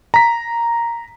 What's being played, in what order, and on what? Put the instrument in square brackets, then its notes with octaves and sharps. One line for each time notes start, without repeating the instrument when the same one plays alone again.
[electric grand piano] A#5 B6